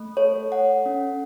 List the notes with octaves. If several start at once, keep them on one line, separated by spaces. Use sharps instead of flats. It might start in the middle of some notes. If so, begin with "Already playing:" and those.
Already playing: A3
A4 C#5
A4 F#5
C#4